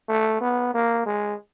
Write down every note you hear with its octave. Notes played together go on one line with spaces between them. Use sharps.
A3
B3
A#3
G#3